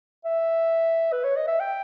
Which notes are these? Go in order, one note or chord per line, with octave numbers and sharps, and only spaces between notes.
E5
B4
C#5
D#5
E5
G5